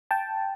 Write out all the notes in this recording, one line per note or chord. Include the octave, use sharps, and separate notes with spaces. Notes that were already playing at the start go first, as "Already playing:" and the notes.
G5 A5